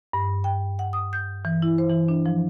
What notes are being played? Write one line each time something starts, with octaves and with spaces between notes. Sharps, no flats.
G2
G5
F#5
D#6
G6
E3
E4
C5
E3
D4
F3